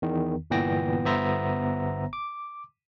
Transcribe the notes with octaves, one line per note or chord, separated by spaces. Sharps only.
E2 D#3
G1 A#2 E3 B3 G5 A#6
G1 B3 C5 E5 A#5 A#6
D6